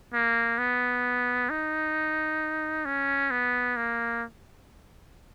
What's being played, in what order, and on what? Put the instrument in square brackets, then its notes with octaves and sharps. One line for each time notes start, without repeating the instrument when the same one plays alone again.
[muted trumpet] A#3
B3
D#4
C#4
B3
A#3